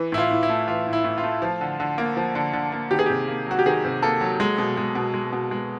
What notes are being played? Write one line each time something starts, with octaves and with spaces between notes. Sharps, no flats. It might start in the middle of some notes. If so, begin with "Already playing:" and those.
Already playing: E3
A2 E4
F4
A2
E4
A3
E3 F4
A2
E4
A2
F4
A3
F3
D3
D3
A#3
F3
D3
D3
A#3
D#3 G4
G#4
C3 G4
A#3
F#3 F#4
G4
D#3 G#4
C3
A#3 A4
F#3
G#3
B2
G#3
B2
G#3
B2
G#3